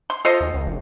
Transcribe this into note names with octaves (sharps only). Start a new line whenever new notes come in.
C6
F4 A4 C5 D#5
D#2
C#2
F1